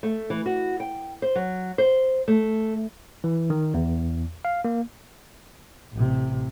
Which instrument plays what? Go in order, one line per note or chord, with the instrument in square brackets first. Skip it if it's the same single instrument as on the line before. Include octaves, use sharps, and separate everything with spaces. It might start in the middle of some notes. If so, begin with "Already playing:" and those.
[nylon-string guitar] A3
E3
F#4
G5
C5
F#3
C5
A3
[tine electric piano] E3
D#3
E2
F5
A#3
[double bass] A1 C3